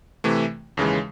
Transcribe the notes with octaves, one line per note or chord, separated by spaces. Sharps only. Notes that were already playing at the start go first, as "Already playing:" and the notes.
C3 E3 A3
D#2 C#3 E3 G#3